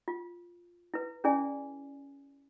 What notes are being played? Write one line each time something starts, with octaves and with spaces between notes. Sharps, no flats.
F4
E4 B4
C#4 E4 G#4 D5 G#5